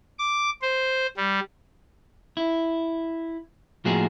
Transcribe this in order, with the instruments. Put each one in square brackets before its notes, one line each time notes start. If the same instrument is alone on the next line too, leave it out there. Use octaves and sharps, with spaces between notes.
[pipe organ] D6
C5
G3
[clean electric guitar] E4
A2 F3 A#3 F#4 G#4